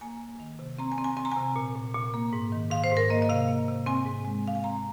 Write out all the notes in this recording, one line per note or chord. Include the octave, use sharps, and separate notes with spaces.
A#3 G#5
A#3
D#3
C3
C4 A#5
G#5
C4
G#5
C4 G#5
A#5
G#5
C3
A#2
A#2
A#2
A#3
G#2
D#3
G#2 F5
C5
G#2
A#4
A#3 D#5
D#5
C3 F5
A#3
C3
C4 G#5
G#2
G#3
C4 F5
G#5
C4 A#5